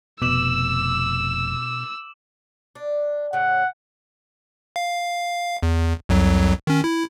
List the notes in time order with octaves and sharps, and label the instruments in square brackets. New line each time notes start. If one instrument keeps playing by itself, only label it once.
[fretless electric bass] F1 B3 [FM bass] B2 [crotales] D6 E7 F#7 [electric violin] E6
[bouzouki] D4
[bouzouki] A2 C#3 [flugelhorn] F#5
[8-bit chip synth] F5
E2
C2 F2 F#3
D#3 C#4
E4